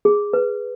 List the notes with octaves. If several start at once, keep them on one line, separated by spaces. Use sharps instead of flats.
G#4
B4